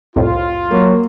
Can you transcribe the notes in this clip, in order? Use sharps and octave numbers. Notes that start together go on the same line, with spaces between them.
C2 F2 A2 F4
F#3 A#3